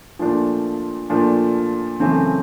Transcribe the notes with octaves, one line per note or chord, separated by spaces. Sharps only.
A#2 F3 A3 D4
A#2 F3 A3 D4
F#2 C#3 E3 A3 C4